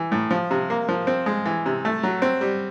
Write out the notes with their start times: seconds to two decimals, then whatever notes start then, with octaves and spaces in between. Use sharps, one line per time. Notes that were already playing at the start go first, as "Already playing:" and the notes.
Already playing: E3
0.12 A2
0.31 F3
0.51 C3
0.70 A#3
0.89 F3
1.07 C4
1.26 G#3
1.46 E3
1.66 C3
1.85 A3
2.03 F#3
2.22 C4
2.41 G3